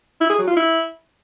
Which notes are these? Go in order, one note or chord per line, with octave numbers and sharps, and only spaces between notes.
E4
G#4
F#3
F4
E4